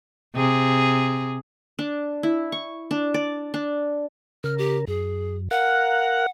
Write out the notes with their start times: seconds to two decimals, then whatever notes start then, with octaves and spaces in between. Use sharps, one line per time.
0.35 C3 G#4
1.79 D4
2.23 E4
2.52 C#6
2.91 D4
3.14 D5
3.54 D4
4.44 C#3 A#4 F6
4.58 G4
4.88 F#2 G#4
5.51 A#4 F5 F#5 F#6